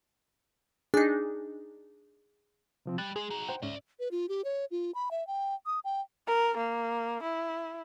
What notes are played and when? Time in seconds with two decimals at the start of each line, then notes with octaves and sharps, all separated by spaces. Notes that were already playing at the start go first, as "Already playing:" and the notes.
0.94 D4 D#4 G#4
2.86 C3 F3 C4
2.98 G3 F#6 A6
3.16 G#3 G#4
3.30 D#4 F#4
3.48 C5 F#5 G5
3.62 G#2 C#4 D5 E5
4.00 B4
4.11 F4
4.29 G4
4.45 C#5
4.71 F4
4.95 B5
5.11 E5
5.27 G5
5.66 D#6
5.85 G5
6.27 A#4
6.57 A#3
7.23 E4